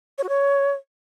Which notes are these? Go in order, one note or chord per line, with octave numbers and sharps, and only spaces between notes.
C#5
F#4
C#5